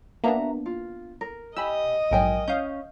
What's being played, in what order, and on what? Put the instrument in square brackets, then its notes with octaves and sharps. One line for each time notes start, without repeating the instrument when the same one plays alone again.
[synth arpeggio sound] A#3 B3 D4 [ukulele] F#4 E5 A#5
[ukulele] F4
A#4
[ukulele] G4 G#5 [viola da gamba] D#5 [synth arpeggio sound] B5 E6
[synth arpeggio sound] A#1 G#2 F#3 [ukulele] A#4 G5 G#5
[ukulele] C#4 [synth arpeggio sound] F5 D#6 G6